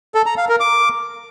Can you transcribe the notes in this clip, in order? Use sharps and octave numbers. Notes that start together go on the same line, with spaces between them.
A4
A#5
F5
A#4
D6